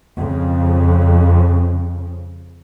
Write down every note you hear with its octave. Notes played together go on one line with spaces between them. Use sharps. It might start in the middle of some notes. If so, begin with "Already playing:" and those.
F2 C#3